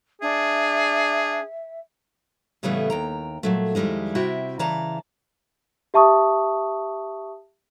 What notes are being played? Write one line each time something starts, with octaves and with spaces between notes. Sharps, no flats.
D4 G#4 E5
A2 C#3 E3 G3 A3 B3
D#2 G5 A#5
A#2 F#3 A3
F2 D#3 G3 G#3 E4
C3 E4 F#4 E5 G5
C#3 E3 D5 A5 A#5
G4 E5 A5 C#6 D#6